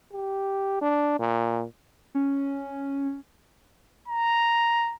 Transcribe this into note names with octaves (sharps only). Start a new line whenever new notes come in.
G4
D4
A#2
C#4
A#5